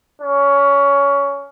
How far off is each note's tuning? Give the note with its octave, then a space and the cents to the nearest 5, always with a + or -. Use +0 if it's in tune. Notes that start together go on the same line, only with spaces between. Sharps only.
C#4 +20